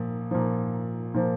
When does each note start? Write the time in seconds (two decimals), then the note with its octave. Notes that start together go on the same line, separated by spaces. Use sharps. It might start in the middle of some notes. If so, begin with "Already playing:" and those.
Already playing: A#2 F3
0.31 A#2 F3
1.14 A#2 F3